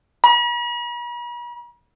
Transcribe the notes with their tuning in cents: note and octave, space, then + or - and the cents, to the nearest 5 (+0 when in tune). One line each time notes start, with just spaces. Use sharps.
B5 -45